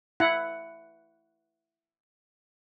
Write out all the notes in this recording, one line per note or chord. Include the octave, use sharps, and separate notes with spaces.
E4 F#5